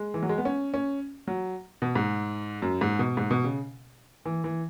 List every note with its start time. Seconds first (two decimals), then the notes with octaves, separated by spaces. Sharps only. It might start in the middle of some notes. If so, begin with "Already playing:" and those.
Already playing: G#3
0.14 E3
0.23 F#3
0.29 G#3
0.38 B3
0.45 C#4
0.74 C#4
1.28 F#3
1.82 B2
1.95 G#2
2.62 F#2
2.81 G#2
2.99 B2
3.17 G#2
3.31 B2
3.44 C#3
4.26 E3
4.44 E3